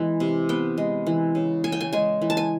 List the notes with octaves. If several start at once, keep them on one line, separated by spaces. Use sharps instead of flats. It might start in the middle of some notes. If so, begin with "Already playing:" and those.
Already playing: E3 G#3 B3
C3
B3 G5
G#3
E3
C#3
C#3 G#5
G5
G#5
G#3 G#5
E3
A5
G#5